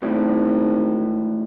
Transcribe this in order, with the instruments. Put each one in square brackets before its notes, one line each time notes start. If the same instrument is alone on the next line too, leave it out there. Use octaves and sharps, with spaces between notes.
[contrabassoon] G#1 [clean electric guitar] E2 A2